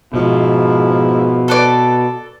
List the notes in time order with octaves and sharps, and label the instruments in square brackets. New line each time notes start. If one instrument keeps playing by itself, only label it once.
[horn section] G#2 F3 E4 [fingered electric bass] B2
[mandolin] A4 B4 D5